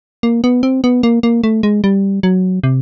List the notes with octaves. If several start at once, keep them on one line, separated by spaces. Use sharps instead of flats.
A#3
B3
C4
B3
A#3
A#3
A3
G#3
G3
F#3
C3